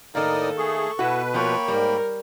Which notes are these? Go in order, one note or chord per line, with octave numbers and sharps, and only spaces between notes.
A2 D#3 A#3 D#4 A4 A#4 D5 D#6
A3 G#4 C#6
B2 E4 F#4 B4
F3 A#3 A#4 C#5 G5 B5
G#2 G3 A#4